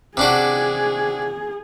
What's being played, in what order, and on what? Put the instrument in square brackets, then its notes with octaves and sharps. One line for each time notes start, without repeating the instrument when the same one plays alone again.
[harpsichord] C3 D4 F#4 [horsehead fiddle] G#4